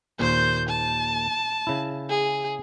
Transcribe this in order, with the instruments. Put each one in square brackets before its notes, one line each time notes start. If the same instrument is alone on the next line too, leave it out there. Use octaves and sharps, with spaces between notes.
[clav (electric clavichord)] D#2 A#2 [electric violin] C5 G6
[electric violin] A5
[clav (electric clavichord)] C#3 E4
[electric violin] G#4